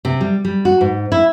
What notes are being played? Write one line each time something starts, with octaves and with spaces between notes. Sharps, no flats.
C3
G3
G3
F#4
G#2
E4